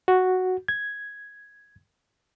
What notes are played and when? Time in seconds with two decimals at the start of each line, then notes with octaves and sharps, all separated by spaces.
0.08 F#4
0.68 G#6